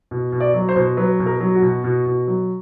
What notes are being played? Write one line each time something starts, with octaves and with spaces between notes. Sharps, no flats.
B2
B2
D5
F#3
C5
B2
F#3 B4
B2
A#4
F#3
F#4
B2
B2
B2
F#3